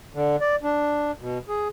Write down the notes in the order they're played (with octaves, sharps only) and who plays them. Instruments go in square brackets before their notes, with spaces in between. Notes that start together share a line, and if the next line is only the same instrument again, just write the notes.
[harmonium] D3
D5
D4
B2
G#4